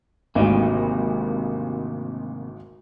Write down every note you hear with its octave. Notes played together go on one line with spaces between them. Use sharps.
G#1 D2 C3 D#3 A#3